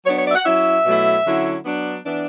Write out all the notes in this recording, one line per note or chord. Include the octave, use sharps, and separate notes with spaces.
F#3 B3 D4 C#5
C#5
D5
E5
F#5
F#3 C#4 E4 E5
B2 F#3 A3 E4
D3 F#3 C#4 E4
F#3 B3 D4
E3 B3 D4